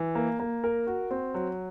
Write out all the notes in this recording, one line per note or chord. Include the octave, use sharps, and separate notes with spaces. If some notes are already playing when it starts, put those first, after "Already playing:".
Already playing: E3
A#3
A#3
A#4
F#4
C4
F#3